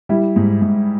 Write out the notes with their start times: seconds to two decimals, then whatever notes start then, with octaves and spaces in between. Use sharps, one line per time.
0.09 G3 E4
0.36 G#2
0.62 G#2